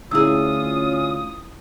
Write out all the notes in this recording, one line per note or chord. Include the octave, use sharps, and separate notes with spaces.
D2 C#4 E4 F4 G#4 D#6 E6